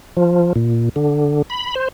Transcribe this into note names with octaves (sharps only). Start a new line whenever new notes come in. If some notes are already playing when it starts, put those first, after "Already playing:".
F3
A#2
D3
B5
C5